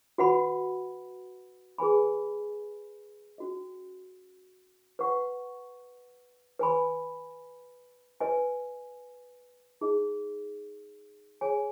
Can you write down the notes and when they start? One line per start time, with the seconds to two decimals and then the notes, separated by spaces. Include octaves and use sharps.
0.18 F#4 B4 F#5 B5
1.78 G#4 B4 G#5 B5
3.38 C#4 F#4 D#5
4.99 B4 F#5 C#6
6.59 B4 G#5 B5
8.20 B4 D#5 G#5
9.81 D#4 G#4 D#5
11.41 G#4 C#5 G#5